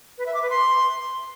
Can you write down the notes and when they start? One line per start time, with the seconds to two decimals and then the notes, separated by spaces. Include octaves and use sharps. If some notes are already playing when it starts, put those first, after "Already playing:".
0.18 B4
0.26 E5
0.34 D6
0.42 B4
0.50 C6